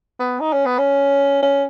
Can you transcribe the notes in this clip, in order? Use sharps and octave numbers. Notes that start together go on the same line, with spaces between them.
B3
D#4
C#4
B3
C#4
C#4